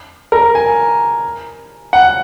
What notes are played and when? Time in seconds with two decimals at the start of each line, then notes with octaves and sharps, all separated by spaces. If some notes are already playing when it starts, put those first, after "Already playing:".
0.32 A#4
0.55 G#5
1.93 F#5